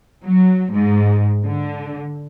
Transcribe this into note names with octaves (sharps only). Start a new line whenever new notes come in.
F#3
G#2
D3